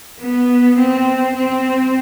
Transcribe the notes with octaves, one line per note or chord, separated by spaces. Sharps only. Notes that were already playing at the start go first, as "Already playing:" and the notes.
B3
C4
C4